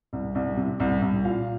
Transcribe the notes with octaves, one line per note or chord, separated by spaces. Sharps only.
C2
C2
C3
C2
C2
A#2 F5